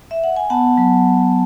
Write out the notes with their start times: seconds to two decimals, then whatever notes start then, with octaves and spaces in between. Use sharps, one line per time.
0.11 E5
0.24 F#5
0.36 G#5
0.50 B3 F#5 A5
0.77 F#3